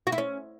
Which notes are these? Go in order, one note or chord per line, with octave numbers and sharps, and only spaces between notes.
F#4
E4
C#4